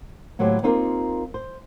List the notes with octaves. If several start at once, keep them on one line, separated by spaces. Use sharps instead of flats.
D#2 A2 F#3 E4 G4 C5
A#3 C4 D#4 F4 G4 A#4
C5